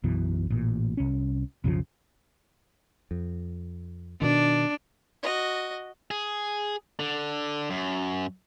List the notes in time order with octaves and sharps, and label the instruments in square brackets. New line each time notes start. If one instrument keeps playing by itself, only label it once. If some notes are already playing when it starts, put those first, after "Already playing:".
[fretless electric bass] B1 F#2 B2 E3
A1 A#2
C2 C#4
B1 F2 C#3 F3
[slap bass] F2
[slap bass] B2 D#3 [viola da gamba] D4
[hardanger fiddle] F#4 D#5
[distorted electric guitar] G#4
D3
F#2